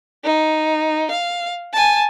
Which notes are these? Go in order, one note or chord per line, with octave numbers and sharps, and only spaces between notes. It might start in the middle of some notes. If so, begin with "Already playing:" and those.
D#4
F5
G#5 A5